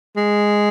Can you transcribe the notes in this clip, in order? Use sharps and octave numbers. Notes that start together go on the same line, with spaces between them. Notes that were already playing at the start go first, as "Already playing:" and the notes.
G#3